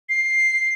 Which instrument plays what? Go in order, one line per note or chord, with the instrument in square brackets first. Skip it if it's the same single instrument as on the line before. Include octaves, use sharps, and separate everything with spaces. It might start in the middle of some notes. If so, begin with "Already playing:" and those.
[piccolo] C7